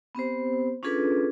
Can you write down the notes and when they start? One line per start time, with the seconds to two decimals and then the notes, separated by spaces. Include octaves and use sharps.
0.15 B3 C4 G4 C5
0.83 C#4 D4 F4 G#4 A4 B4